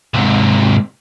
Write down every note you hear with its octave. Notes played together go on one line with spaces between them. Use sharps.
G#2 C3